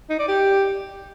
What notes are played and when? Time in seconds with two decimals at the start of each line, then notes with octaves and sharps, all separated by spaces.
0.10 D#4
0.19 D5
0.28 G4